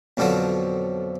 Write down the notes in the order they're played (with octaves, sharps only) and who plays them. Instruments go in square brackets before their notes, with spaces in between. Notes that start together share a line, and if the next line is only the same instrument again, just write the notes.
[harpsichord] F2 B2 D3 F3 F#3